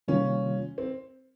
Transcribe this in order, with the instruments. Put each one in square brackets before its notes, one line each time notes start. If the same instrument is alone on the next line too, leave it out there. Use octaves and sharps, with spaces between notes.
[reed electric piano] C3 D#3 G3 A#3 F4 [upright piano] C#4
[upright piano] C4